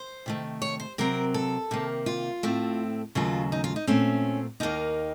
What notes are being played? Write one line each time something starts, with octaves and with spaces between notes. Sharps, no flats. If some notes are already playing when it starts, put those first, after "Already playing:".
Already playing: C5
C3 D#3 A3
C#5
C5
C3 F#3 C4 A#4
A4
C3 D#3 A#3
F4
A2 A3 C4
D#2 C#3 F#3 A3 F4
D#4
F4
D#4
A#2 A3 C4 C#4
D#2 D#3 A#3 D#4